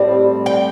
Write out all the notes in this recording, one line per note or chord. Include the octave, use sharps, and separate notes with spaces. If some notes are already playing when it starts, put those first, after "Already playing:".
Already playing: A2 G3 C4
G5